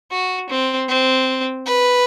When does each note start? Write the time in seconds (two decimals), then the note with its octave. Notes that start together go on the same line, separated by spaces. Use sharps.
0.11 F#4
0.50 C4
0.89 C4
1.66 B4